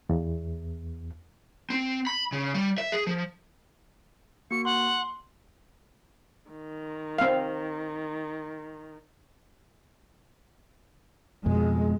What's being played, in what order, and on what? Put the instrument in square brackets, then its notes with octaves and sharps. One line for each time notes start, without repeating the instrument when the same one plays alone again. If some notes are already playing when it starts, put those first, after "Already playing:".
[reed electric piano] E2
[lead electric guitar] C4
B5
C#3
G3
E5
G#4
F3
[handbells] A#3 F#4 [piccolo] C#7
[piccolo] F#5 [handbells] C6
[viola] D#3
[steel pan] C4 F5
[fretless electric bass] F2 B2 [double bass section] G#3